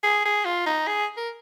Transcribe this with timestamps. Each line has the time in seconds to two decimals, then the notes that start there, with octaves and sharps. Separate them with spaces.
0.03 G#4
0.25 G#4
0.45 F4
0.66 D#4
0.87 G#4
1.17 A#4